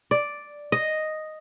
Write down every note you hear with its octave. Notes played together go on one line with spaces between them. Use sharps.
D5
D#5